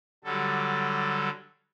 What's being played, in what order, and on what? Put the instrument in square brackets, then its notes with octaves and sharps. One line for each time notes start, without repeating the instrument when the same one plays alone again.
[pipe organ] D3 F#3 G3 A4